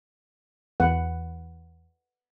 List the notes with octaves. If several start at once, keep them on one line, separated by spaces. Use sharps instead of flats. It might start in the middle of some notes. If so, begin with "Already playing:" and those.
E2 B4 F#5